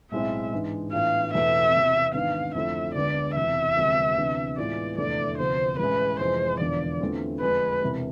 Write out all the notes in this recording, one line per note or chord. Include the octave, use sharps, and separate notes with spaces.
B1 A2 G#3 C4 E4 E5
G#2 E3 G#3 D4
A2 E3 B3 D4 F4 F5
E2 B2 A3 E5
E2 C3 E3
G#1 G#2 E3 B3 D4 F5
F2 D3 A3 C4 E4 E5
D2 D3 G#3 B3 D5
E1 E2 C3 E3 E5
D2 C3 F3 G#3 B3
D2 C3 E3 B3 D4
A2 E3 G#3 B3 F4 D5
F1 E2 D3 A3 E4 D5
D2 C3 F3 B3 C5
A1 A2 G#3 B4
F1 F2 E3 G#3 C5
E1 E2 D3 F3 D5
E2 D3 A3 C4 F4
F2 D3 G#3 D4 B4
E1 E2 C3 E3 B3